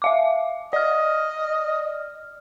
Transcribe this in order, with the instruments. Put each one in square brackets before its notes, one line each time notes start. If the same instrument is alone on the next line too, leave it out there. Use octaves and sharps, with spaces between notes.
[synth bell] E5 F5 D6
[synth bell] D5 F6 [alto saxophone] D#5